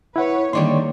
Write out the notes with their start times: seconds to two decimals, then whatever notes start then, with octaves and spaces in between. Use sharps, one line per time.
0.16 E4 B4 C#5 F#5
0.53 D3 D#3 G3 A#3 C#5 D5 C6